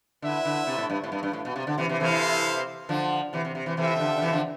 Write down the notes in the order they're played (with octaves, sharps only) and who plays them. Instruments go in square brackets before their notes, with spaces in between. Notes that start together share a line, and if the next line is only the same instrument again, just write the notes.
[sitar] D3 [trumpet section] E4 B4 E5
[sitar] D3
C3
A2
G2
A2
G2
G2
A2
B2
C3
D3
C3 E3
C3 E3
[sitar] C3 E3 [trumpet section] E4 A4 C5 F5
[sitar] D3 F3
C3 E3
C3
C3
C3 E3
[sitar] C3 E3 [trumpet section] F4 A4 E5 G5
[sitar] C3
D3
D3
C3 E3
D3 F3